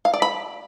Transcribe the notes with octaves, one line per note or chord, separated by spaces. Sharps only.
F5
D5
B5